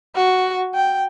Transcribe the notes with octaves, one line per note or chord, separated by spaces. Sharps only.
F#4
G5